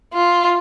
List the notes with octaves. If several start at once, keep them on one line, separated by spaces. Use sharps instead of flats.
F4